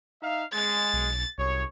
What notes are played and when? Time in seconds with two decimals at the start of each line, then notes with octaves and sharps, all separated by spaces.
0.22 D#4 E5 F5
0.53 G#3 A6
0.93 B1
1.38 C2 F#2 G#4 C#5